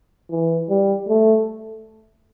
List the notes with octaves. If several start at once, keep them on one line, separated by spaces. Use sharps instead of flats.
E3
G3
A3